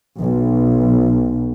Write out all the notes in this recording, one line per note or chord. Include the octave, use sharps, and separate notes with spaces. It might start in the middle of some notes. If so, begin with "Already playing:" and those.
B1